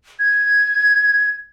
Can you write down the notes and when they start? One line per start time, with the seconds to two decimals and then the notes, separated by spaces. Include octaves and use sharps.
0.19 G#6